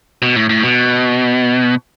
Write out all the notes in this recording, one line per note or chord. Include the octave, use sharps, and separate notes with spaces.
B2
A2
A2
B2